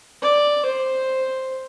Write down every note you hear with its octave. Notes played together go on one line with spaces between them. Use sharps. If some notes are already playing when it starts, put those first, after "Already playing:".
D5
C5